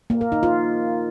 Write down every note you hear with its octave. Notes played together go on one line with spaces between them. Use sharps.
A#3
A#4
D#4
F4